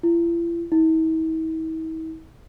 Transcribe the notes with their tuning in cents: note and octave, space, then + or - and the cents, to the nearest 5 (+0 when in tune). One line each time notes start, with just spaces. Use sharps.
E4 +45
E4 -45